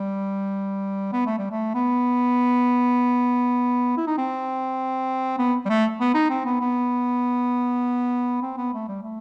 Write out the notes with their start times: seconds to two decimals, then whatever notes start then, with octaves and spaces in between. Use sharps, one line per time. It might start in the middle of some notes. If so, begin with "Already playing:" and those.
Already playing: G3
1.13 B3
1.26 A3
1.39 G3
1.51 A3
1.74 B3
3.97 E4
4.07 D#4
4.18 C4
5.38 B3
5.65 G3
5.69 A3
6.00 B3
6.14 D#4
6.30 C4
6.45 B3
6.61 B3
8.42 C4
8.58 B3
8.74 A3
8.88 G3
9.03 A3